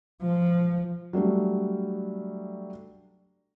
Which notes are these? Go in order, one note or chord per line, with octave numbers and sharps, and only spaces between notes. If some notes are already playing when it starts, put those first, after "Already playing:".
F3
F#3 G3 A3 D4